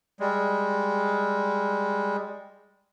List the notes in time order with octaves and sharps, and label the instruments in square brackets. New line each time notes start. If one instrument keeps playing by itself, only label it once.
[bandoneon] G3 G#3